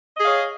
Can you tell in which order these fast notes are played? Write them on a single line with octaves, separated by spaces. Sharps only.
D#5 G#4 F5 C#5